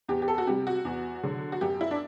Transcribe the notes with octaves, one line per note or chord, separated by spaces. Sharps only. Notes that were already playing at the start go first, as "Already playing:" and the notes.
E2 G4
G4
A4
F#4
C3 G3 G4
F#4
E2
D3 F#3
F#4
F#2 G4
E4
D4